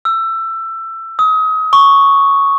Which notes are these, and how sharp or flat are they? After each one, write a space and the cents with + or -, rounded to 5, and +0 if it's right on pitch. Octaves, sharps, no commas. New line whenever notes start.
E6 +20
D#6 +30
C#6 +0